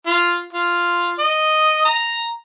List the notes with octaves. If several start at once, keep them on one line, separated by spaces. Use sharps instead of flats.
F4
F4
D#5
A#5